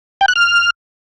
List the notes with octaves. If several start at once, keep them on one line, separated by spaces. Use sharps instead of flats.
G5
F#6
F6